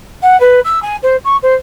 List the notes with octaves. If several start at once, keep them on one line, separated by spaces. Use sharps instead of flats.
F#5
B4
E6
G#5
C5
C#6
C5